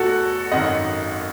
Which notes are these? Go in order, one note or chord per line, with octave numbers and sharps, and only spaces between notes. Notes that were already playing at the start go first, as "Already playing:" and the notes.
Already playing: E2 B2 A3 F#4 A4
G#1 F#2 D#3 D#5 F#5